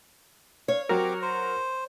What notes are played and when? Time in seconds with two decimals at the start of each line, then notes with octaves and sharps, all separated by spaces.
0.68 C#5 F5
0.89 F#3 C4 F#4 G4 A#4 D6
1.22 C5